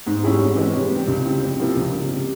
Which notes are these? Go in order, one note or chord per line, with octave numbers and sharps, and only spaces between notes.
G#2
G3 C#4 E4 G#4
F2
E3 G#3 C#4
C3
G3 C4
C#2
C#3 G3 C4 E4
F2
C3 F3 A#3 E4
C#2
C#3 G3
C3